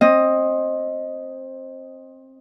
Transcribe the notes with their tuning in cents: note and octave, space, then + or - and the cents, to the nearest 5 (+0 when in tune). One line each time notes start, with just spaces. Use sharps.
C4 +20 D#5 +0